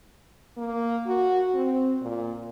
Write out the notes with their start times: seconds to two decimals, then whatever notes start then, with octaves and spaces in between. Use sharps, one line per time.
0.57 A#3
1.07 F#4
1.55 C4
2.02 A#2